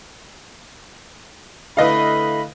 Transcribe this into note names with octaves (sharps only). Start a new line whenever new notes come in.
D3 A3 E4 B4 D#5 F5 B5